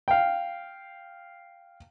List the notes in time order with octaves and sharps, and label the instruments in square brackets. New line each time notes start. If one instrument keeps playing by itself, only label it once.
[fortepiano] F5 G5